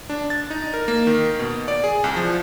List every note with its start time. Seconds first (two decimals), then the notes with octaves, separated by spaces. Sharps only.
0.10 D4
0.30 A6
0.50 D#4
0.74 A#4
0.88 A#3
1.07 D#3
1.39 B2
1.68 D5
1.84 G#4
2.04 C2
2.16 F3